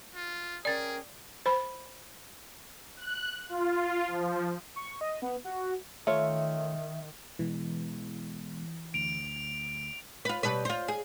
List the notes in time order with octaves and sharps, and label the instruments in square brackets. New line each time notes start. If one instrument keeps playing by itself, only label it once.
[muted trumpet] F4
[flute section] C#4 A#4 G5 [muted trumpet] G#4 [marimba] D5 A6
[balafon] C5 B5
[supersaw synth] F#6
F4
F3
[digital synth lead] C#6
D#5
B3
F#4
[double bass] D#3 [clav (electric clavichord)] A3 F4 [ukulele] C#5 [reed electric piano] E5
[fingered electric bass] B2 G#3 [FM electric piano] E3
[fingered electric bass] D2 [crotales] D7 F7
[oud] F4 B4
B2 G3 B4
F4 C5
G#4